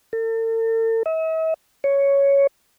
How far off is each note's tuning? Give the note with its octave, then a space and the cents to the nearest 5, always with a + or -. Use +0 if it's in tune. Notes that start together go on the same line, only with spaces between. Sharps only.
A4 +45
E5 -45
C#5 +5